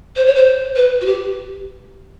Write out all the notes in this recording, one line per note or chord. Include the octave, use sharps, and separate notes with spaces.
C5
C#5
C5
B4
F#4
G4